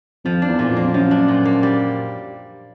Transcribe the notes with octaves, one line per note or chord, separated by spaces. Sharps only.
F2 F3
D4
E2
A#2
F2
A#3
F2
F#2 F3
D4
A#2
A#3
G3